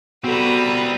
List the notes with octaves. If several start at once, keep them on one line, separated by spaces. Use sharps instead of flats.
G3 B3 C4 F#4 A4 B4 A#5